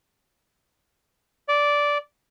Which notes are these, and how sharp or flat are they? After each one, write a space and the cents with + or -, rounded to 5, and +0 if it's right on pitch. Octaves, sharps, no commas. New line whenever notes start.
D5 -10